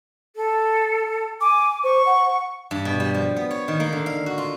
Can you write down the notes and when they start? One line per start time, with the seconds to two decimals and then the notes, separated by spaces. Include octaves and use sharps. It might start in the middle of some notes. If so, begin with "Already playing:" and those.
0.36 A4
1.41 G#5 D6
1.84 C5 C#6
2.06 F#5
2.71 G2
2.85 B2
3.00 G3
3.14 F3
3.36 B3
3.51 C#5
3.68 D#3
3.80 A#3
3.93 D3
4.06 F5
4.26 F#4
4.38 F4